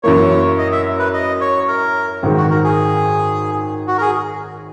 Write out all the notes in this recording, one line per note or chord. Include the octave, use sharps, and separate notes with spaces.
F#2 E3 A#3 C#5
D#5
E5
B4
D#5
C#5
A#4
G#1 G#2 D#3
F#4
A#4
G#4
F#4
A#4
G#4